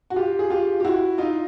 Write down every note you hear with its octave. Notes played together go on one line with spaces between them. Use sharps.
F#4
F4 G4
G#4
F4 G4
G4
E4 F#4
D#4 F4